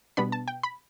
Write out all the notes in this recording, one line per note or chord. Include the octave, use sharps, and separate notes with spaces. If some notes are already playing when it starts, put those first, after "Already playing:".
B2 G3 B3 D4 B5
A5
G5
B5